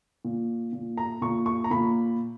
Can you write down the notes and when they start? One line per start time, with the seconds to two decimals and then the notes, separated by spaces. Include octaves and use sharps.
0.25 A#2
0.73 A#2
0.98 A#5
1.22 A#2 C#6
1.46 C#6
1.64 A#5
1.71 A#2 B5